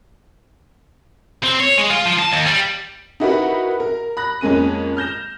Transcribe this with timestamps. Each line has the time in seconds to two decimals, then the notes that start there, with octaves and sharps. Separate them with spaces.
1.43 C4
1.60 C#5
1.78 G#3
1.91 F4
2.06 F3
2.19 A5
2.32 D#2
2.46 G3
3.20 D#4 E4 F#4 G4 A#4 B4
3.80 A#4
4.17 B5 F#6 A#6
4.41 F2 G#3 A#3 C#4 D#7
4.97 F6 G6 A#6 E7